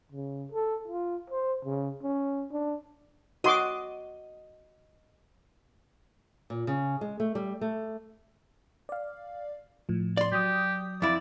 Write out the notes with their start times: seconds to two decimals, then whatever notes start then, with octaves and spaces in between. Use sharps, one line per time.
0.12 C#3
0.52 A4
0.88 F4
1.30 C5
1.65 C#3
2.03 C#4
2.52 D4
3.44 F#4 D#5 C6 D6
6.50 A#2
6.67 C#3
7.01 G#3
7.20 A3
7.35 G3
7.61 A3
8.89 D5 F5
9.89 A2 F3
10.17 D5 C6
10.32 F#3 G4 D#6
11.02 F2 E4 D5